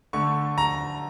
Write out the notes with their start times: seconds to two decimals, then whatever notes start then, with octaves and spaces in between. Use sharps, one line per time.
0.13 D3 A3 C#6
0.58 A#5